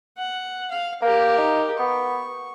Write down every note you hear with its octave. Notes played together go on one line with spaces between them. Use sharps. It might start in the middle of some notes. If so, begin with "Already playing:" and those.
F#5
F5
A#3 G4 A#4
D#4
B3 C#6